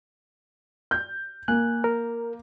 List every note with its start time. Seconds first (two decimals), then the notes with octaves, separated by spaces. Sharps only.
0.91 G6
1.48 A#3 G#5 F#6
1.84 A#4